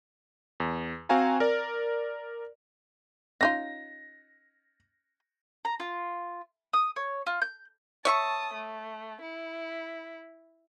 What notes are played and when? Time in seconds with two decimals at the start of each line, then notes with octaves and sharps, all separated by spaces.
0.60 E2
1.09 C4 F#4 C5 F5 G#5 A#5
1.40 A#4 D5
3.41 C#4 D#4 F4 A#6
5.65 A#5
5.80 F4
6.73 D#6
6.96 C#5
7.27 F4
7.42 G6
8.05 C#5 E5 A5 C#6 D#6
8.53 A3
9.22 E4